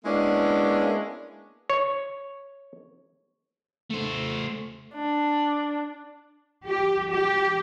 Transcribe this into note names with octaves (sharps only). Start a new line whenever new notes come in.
G#3 A#3 B3 C#4 D4 E4
C#5
A3 C5
D4
G4
G4